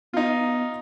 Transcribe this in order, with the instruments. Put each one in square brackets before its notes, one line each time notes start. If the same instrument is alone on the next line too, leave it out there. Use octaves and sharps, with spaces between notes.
[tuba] B3 [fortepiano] D#4 F4